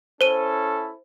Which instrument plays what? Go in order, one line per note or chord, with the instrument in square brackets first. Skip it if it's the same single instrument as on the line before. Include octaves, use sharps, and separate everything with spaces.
[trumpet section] C#4 E4 A4 [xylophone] C5 D#7